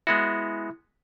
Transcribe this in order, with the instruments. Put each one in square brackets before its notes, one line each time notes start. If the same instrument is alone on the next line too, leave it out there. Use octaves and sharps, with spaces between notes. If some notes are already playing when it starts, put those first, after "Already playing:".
[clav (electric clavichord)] G#3 B3 F#4 [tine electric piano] E4